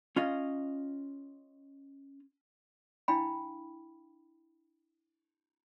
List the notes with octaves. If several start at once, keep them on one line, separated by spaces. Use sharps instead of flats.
C#4 F4 D#5
D4 E4 F5 G5 B5